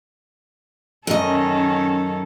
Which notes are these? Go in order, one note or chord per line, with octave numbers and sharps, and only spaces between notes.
F#2 D#3 C#4 A4 D#5